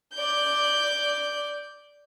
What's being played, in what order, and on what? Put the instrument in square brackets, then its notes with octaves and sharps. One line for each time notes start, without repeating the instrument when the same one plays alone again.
[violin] D5 G6